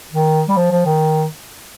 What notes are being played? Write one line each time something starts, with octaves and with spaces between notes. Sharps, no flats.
D#3
G3
F3
F3
D#3